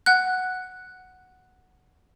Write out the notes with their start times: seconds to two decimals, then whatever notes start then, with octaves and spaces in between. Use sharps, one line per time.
0.06 F#5 F#6